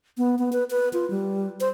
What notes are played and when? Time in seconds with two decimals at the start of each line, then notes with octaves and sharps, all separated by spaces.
0.18 B3
0.39 B3
0.52 B4
0.70 B4
0.93 F4
1.10 G3
1.61 C5